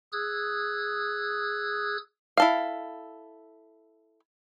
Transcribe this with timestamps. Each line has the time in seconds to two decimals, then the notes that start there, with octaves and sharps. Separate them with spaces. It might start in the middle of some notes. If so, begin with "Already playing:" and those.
0.13 G#4 D#6 E6 F#6 G#6
2.37 E4 A4 F5